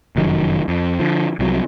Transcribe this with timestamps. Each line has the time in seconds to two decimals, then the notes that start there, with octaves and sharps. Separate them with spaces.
0.16 F1 F#2 D#3 F#3
0.68 F2
0.99 D3 F3
1.39 C2 C3 F3 F#3